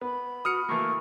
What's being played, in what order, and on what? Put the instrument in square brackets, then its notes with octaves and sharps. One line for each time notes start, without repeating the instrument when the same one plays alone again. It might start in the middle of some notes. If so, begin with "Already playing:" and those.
[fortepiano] B3 [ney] B5
[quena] F#4 [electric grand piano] D#6 F6 C#7
[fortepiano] E3 A3 A#3 [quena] C#6